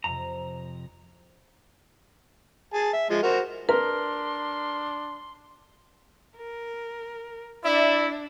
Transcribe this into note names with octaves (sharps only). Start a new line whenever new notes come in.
F2 C3 A#5
G#4 A5
E5
F3 G#3
F#4 A#4 C5
D4 A#4 B4 C6
A#4
D4 E4 D5 E5